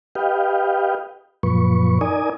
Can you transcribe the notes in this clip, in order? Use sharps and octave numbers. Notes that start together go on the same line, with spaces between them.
G4 B4 D#5 F5 G5
F#2 A#2 F3 B4 C#6
D#4 A#4 D5 G#5 D#6